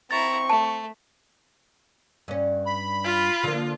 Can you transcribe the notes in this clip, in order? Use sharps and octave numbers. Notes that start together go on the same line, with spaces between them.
C4 E4 A#5 C#6 A6
A3 A5
G2 C#4
B5
F4
D3 F3 A#3